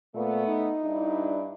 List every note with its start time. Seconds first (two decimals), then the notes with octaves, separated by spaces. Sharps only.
0.15 A#2 A3 B3
0.47 D#4
0.83 G2 D4 E4